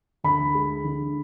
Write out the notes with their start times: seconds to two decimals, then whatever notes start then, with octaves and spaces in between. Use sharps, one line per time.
0.24 D2 B5
0.55 G#3
0.84 D3